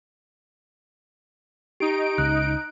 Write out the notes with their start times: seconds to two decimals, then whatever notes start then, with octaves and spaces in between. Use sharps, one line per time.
1.80 D#4 G4 D7
2.18 C#2 F#6